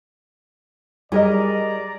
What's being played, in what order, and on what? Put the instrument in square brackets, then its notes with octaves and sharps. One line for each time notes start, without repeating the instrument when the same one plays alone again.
[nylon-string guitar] G3 [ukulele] G#4 A#4 D#5 [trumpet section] D5 A#5